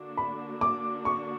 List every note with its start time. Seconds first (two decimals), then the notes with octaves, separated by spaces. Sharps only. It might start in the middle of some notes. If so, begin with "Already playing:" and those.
Already playing: D3 A#3 D4 F#4
0.17 B5
0.61 D6
1.05 C#6